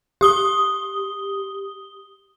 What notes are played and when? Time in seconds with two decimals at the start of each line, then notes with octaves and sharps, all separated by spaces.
0.21 G4 D#6 G7